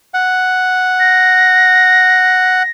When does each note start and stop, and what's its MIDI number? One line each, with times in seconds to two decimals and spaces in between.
0.14 2.63 78
1.00 2.71 94